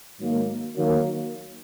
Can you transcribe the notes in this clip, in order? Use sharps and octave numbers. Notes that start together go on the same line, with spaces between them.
G#2 D#3 F#3 A#3
D#3 F#3 A#3